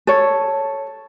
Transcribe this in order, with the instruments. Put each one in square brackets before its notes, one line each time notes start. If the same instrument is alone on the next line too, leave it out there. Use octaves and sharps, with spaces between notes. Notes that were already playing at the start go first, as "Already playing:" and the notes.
[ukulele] A4 C#5